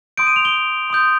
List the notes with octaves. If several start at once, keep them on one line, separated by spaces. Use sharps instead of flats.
C6 D#6 G6 D7
D#7
F7
G7
C6 D#6 G6